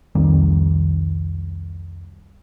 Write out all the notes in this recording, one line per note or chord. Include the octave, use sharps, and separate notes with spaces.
C2 F2 D#3 G3